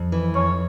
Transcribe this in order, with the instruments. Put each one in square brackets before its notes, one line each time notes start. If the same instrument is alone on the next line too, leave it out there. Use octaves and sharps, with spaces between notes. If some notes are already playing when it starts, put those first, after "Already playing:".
Already playing: [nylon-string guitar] F2
E3
[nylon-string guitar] F2 [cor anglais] C#5